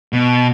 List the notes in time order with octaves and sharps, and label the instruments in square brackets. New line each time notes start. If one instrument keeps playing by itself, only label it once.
[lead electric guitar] B2